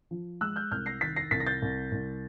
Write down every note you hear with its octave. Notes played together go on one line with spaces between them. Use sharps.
F3
G#3 E6 F#6
F6 G6
C2 F6 G6
A#6 C7
D#3 A6 B6
A#6 C7
C2 A6 B6
A#6
G6 A6
C2
C2